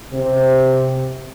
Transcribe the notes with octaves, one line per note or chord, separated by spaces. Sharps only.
C3